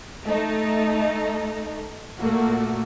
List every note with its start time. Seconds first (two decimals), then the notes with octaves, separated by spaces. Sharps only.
0.24 A3 D#4 A4
2.19 A#2 A3 A#3 F#4